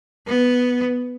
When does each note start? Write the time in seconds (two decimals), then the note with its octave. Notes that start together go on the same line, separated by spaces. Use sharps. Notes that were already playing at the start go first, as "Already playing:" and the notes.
0.27 B3